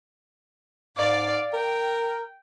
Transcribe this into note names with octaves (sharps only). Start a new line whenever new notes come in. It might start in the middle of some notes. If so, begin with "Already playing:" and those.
G#2 D5 F5
A#4 G5